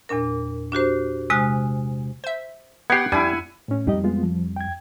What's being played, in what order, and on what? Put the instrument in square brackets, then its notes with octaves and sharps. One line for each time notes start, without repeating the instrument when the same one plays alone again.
[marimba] E2 A#2 D4 A#4
D4 F#4 G4 C5
C3 G#3 G#5 D#6 F6 F#6
[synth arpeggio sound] C5 E5
[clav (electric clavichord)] B3 G4 [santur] F#5 G5 [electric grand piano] G#6 C7
[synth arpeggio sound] F2 D4 [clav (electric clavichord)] G3 [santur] E4 G#5
[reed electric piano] A2 C#4
[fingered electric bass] F2 G3 [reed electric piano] D#4 G4 D#5
[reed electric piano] G#3 B3 F4
F3
G5 G#6